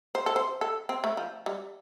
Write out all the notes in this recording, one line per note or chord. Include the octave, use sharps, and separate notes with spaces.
C5
A4
C5
A4
C4
A3
F3
G3